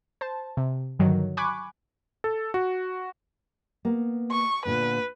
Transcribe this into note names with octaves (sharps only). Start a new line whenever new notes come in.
C5 A5
C3
G2 D3 D#3 F#3
G#5 B5 C#6 D6 F#6 G#6
A4
F#4
A#3 B3
C#6
A#2 D3 B3 B4